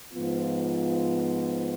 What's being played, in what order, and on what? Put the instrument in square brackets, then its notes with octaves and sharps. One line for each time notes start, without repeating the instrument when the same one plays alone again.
[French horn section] G#2 F3 B3 F4